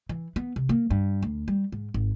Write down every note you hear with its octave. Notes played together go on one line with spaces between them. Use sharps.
E3
B3
C3
A#3
G2
D2
G3
G#2
G#1